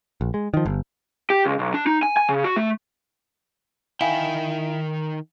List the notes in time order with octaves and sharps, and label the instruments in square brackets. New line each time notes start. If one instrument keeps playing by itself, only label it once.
[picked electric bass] A#1
G#3
D#3 F3
G1
[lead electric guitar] G4
C#2
B1
D4
D#4
G#5
G#5
C#3
F#4
A3
[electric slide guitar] D#3 D#4 G5 [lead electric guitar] E4 [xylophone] F5 G#5